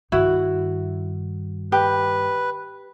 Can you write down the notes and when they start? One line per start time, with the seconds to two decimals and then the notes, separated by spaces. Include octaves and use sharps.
0.12 G2 D#3 E4 F#4
1.72 G4 B4